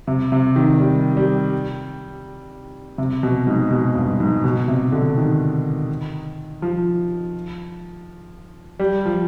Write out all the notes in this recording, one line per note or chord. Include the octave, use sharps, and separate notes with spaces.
C3
C3
D#3
G3
G3
C3
B2
G#2
B2
G2
G#2
B2
C3
D3
D#3
F3
G3
F3